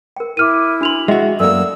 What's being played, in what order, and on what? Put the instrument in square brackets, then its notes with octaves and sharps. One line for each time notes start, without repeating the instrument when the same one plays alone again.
[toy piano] A#4 G5
[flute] E4 [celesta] D6 F6 D#7
[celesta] D4 F7 F#7 [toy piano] F#4 C6
[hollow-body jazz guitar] G#3 F#4 [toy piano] D#5 G5 [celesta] E5
[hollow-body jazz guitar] F#2 A#3 [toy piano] A4 D5 [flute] E6